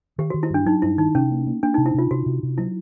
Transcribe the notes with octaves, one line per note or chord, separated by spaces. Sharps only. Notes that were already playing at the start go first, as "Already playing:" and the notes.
D#3 G4
F#4
D#3
E4
G2 D4
F#3 D#4
G2 E4
D#3 D#4
C3 C#4
A#3
A#3
A#3 D4
D#4
C3
E4
C3 F4
C3 F#4
C3
C3
F#3 E4